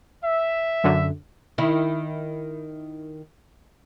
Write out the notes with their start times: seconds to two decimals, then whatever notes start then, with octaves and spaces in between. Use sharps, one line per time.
0.24 E5
0.84 F#2 D3
1.58 D#3 E4